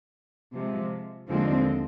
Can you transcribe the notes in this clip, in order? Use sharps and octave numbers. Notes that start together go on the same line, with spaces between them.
C3 F3 G#3
D#2 D3 F3 G#3 C4